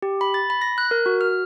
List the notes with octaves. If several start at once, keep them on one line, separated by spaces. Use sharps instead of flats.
G4
B5
A6
B5
A#6
F#6
A#4
F#4
F6